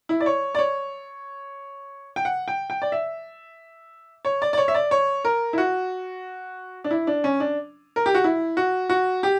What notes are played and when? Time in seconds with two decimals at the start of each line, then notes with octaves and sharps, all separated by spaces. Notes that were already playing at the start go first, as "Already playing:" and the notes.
0.09 E4
0.21 D5
0.26 C#5
0.55 D5
0.59 C#5
2.16 G5
2.25 F#5
2.48 G5
2.70 G5
2.82 D5
2.92 E5
4.25 C#5
4.42 D5
4.53 D5
4.58 C#5
4.68 E5
4.74 D5
4.91 C#5
5.25 A#4
5.53 E4
5.58 F#4
6.84 D4
6.91 E4
7.07 D4
7.24 C#4
7.40 D4
7.96 A#4
8.06 G4
8.15 F#4
8.24 E4
8.57 F#4
8.90 F#4
9.23 G4